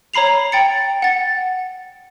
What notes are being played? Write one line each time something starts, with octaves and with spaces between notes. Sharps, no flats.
C#5 A#5 B5 C7 F7
G5 A6 C#7
F#5 A6